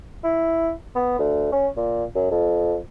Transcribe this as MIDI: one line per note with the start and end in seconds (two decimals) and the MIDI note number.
0.24 0.71 64
0.96 1.17 59
1.19 1.51 38
1.52 1.68 61
1.77 2.04 46
2.15 2.29 42
2.31 2.77 41